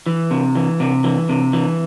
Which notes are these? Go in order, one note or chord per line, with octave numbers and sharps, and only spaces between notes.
E3
C3
E3
C3
E3
C3
E3